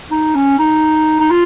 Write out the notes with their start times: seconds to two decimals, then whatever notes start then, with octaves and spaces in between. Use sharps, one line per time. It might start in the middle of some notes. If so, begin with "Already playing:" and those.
0.11 D#4
0.35 C#4
0.59 D#4
1.20 D#4
1.30 F4